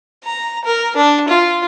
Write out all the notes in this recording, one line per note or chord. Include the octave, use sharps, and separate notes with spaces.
A#5
A#4
D4
F4